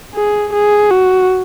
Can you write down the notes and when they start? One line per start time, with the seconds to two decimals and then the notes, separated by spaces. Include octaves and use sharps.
0.14 G#4
0.53 G#4
0.91 F#4